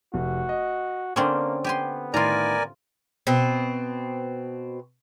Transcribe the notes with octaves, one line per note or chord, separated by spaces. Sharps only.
F1 F#4
D#5
D3 A#3 C4 C#4 A4 D6
B3 G4 G#5 C6
A2 D#3 F4 A#4 D5 G#5 A#5
B2 C4